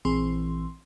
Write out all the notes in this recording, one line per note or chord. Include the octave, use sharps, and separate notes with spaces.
A#1 E3 C4 G#4 C6